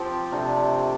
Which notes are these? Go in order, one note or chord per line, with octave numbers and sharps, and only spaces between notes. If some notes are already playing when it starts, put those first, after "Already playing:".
Already playing: F3 C4 G4
C3 A3 D4